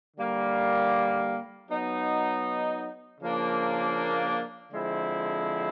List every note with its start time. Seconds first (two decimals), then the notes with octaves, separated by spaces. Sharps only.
0.17 D3 G3 A#3
1.69 F#3 B3 D#4
3.21 C#3 F3 A#3 D4
4.72 D3 F3 G#3 C4 E4